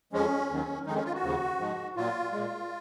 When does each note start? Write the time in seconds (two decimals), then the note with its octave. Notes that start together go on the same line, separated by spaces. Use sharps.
0.13 F2 F3 G#3 C#4
0.50 D#2 D#3 F#3
0.86 F2 D#3 G#3 D#4
0.96 C#4
1.04 F4
1.14 F#4
1.22 D#2 C#3 F3
1.59 G#2 F3 G#3
1.96 A#2 F#3 F4
2.32 A#2 G#3